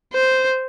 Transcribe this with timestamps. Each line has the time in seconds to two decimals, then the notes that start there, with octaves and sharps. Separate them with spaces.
0.14 C5